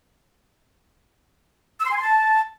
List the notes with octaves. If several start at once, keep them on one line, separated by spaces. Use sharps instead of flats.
E6
C6
G#5
C6
A5